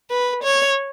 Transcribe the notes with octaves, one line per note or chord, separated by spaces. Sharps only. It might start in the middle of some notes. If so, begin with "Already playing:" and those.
B4
C#5